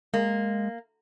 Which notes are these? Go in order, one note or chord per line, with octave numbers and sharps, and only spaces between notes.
G#3 A#3